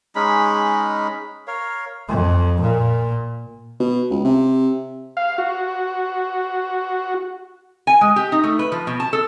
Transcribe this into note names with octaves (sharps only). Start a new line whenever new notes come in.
G#3 C#4 D#4 B5
A#4 C#5 F5
F2
A#2
B2
C#2
C3
F5
F#4
G#5
G#3
G4
D#4
A3
B4
F3
B2
A5
A4